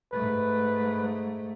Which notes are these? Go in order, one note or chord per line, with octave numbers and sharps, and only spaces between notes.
G#2 A3 B4